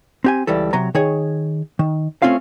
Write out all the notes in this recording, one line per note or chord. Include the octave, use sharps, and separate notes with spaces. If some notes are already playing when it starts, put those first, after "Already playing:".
C4 G4 G#5
C#2 E3 G3 A4
C3 F#3 A#5
D#3 G#4 C#5
D#3
A3 C4 C#4 F4 F5